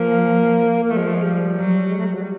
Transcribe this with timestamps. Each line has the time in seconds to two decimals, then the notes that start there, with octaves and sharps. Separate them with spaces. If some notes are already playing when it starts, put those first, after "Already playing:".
Already playing: F3 A#3
0.83 A#3
0.90 F3 A3
0.98 G#3
1.06 A3
1.15 G#3
1.23 G3
1.56 F#3
1.89 G#3
1.98 A3
2.06 G3
2.15 F#3
2.22 G3